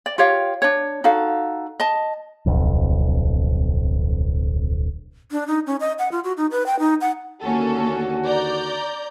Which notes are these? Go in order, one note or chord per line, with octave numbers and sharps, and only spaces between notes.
D5
F4 G4 C#5 F5
D4 C#5
D#4 F#4 A4 F5
D#5 A5
D1 B1 F2
D4
D#4
C#4
D#5
F#5
F4
F#4
D#4
B4
G5
D#4
F#5
D#2 D3 A#3 C#4 F#4 A4
D5 A#5 G6